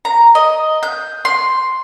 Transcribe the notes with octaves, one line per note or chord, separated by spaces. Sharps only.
A#5
D#5
G6
C6